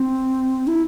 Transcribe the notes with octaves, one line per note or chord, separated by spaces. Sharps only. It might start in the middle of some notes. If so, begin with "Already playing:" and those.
Already playing: C4
E4